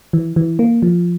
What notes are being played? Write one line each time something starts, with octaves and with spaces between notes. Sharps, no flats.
E3
E3
A#3
F3